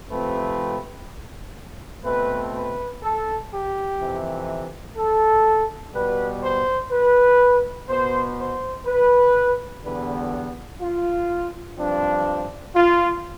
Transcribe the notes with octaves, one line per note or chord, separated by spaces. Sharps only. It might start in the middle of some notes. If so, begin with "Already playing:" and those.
C3 F3 A3 C4 B4
B2 A3 C4 B4
B4
A4
G4
F2 C3 E3
A4
B2 G3 B3 B4
C5
B4
B2 B3 C5
C5
B4
E2 D3 G3 B3 B4
F4
G2 F3 C4 D4
F4